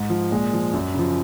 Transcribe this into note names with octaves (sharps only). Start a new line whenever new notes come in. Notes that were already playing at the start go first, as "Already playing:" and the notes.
Already playing: G#2
F3
A#2 G#3
F3
F#2
C#3 F3